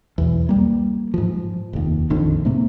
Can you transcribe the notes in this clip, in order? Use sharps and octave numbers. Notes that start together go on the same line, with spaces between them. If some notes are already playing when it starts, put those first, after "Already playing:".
B1 E2
G3 A#3
G#2 F3
F1 D#2
A#1 F2 D3 D#3
G#2 C3 A#3